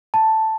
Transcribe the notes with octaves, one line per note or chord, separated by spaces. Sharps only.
A5